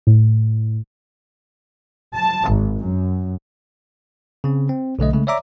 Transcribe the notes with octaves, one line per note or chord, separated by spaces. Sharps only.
A2
A5
G#1
F#2
C#3 C4
C4
B1 D3 A3 D#5
C#3 G#3 A3
C#5 D5 E5 A#5 D6